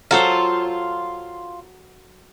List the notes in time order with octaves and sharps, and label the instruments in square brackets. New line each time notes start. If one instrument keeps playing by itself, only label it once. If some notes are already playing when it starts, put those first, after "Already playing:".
[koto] F#3 A4 C5 [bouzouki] F4